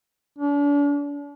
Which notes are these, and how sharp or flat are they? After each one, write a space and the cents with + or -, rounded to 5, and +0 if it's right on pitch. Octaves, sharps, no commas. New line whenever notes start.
D4 -40